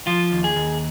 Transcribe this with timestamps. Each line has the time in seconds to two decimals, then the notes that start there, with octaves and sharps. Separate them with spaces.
0.07 F3 F4
0.32 D#2
0.44 G#4
0.56 D#2